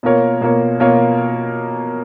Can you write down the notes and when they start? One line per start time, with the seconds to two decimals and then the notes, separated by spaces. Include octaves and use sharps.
0.03 B2 A#3 F4 A#4 C#5
0.41 B2 A#3 F4 A#4 C#5
0.80 B2 A#3 F4 A#4 C#5